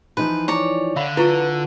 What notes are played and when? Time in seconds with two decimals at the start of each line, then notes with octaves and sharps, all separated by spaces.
0.17 E3 F3 D#4 B4
0.48 C#5 D5 A#5
0.96 D3 E5 F5 B5
1.17 E4 F4 B4 A#5 C#6